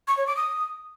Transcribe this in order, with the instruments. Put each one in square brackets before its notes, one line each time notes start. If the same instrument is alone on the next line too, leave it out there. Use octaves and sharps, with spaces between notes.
[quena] C#6
C#5
D6
D#6